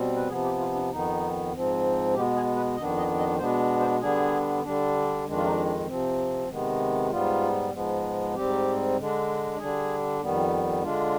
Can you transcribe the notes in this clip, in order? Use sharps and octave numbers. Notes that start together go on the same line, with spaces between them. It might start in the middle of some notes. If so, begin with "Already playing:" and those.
Already playing: B2 G3 C4
B4
C3 F3 B3 G#4
G4
F4
D4
F2 D#3 B3 D#4
G#2 F3 C4
B2 G#3 B3 G4
G#4
B4
F2 D#3 B3 D4 D#5
D#5
D#5
B2 G#3 B3 D4 C5
C5
D3 G3 B3 D4 G#4
D3 G3 D4
F2 D#3 G#3 D4
F4
D#4
D4
C3 F3 C4
C3 D#3 G#3 B3
G#2 G3 B3 F4
G#2 F3 G#3 B3
G#2 G3 C4 G4
D3 G#3 D4
D3 G3 D4 G#4
F2 D#3 G3 B3
D3 G#3 D4 F4